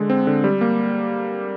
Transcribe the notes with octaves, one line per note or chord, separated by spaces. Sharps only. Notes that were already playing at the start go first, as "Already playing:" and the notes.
Already playing: D3 G#3
C4
D3
G3
A#3